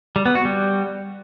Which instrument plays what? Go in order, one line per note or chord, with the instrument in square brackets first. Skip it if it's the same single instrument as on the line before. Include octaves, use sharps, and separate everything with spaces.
[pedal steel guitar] G3
B3
F#4
G3